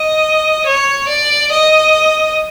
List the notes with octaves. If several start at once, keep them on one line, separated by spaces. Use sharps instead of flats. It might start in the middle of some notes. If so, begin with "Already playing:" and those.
Already playing: D#5
C#5
D5
D#5